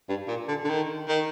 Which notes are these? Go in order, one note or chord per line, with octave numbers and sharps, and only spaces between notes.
G2
A#2
D3
D3
D#3
D#3